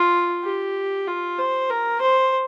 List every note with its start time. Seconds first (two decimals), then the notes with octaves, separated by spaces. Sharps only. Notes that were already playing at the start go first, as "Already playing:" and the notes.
Already playing: F4
0.44 G4
1.07 F4
1.39 C5
1.70 A#4
2.01 C5